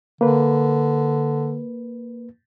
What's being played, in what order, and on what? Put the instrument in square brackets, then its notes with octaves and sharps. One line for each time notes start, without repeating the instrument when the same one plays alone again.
[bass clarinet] D3 [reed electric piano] A#3 B4